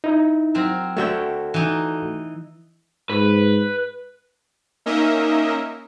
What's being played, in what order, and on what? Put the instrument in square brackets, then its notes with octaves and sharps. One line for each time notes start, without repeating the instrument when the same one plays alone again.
[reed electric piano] D#4 E4
[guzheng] F#3 C4 A#4
[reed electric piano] A3 F#4 A4 [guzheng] C#5 E5 G5
[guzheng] E3 D#4
[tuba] G#2 [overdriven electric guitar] B4
[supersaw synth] A#3 C#4 D#4 A#4 D#5 E5